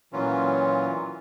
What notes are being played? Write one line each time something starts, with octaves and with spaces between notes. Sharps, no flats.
A#2 E3 F#3 C#4 F4